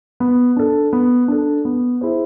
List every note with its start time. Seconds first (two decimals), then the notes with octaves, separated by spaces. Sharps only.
0.20 B3
0.57 D4 A4
0.93 B3
1.28 D4 A4
1.65 B3
2.01 E4 G#4 C5